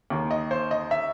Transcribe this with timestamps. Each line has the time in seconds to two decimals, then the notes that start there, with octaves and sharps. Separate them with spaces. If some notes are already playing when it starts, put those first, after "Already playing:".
0.10 D#2 D#3
0.31 D#5
0.51 C5
0.71 D#5
0.91 E5